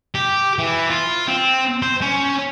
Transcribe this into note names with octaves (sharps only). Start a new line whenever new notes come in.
G4
E3
F4
C4
C5
C#4